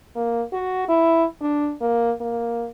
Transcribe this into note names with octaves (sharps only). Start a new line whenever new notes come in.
A#3
F#4
E4
D4
A#3
A#3